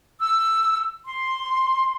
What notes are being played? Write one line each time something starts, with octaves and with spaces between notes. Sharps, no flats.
E6
C6